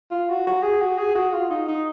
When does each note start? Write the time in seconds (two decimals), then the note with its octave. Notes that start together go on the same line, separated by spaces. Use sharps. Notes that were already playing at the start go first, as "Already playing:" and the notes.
0.11 F4
0.29 F#4
0.47 F#4
0.63 G#4
0.81 F#4
0.98 G#4
1.15 F#4
1.33 F4
1.50 D#4
1.68 D#4